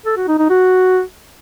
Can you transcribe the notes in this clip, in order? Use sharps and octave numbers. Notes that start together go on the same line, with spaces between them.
A4
F#4
D#4
D#4
F#4